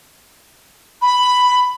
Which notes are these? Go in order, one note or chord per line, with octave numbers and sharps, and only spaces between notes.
B5